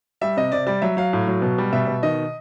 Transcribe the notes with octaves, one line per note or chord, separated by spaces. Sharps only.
G3 E5
C3 D#5
C3 D5
G3 D5
F#3 E5
F#3 F5
A2
F#3
B2
G3
B2 E5
B2
D#3 D#5